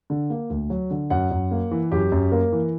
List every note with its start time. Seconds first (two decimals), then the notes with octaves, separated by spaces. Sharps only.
0.10 D3
0.30 A#3
0.50 D2
0.70 F#3
0.91 D3
1.10 F#2 F#5
1.31 F#2
1.51 A#3
1.71 E3
1.91 F#2 G4
2.12 F#2
2.32 A#3 A#4
2.52 E3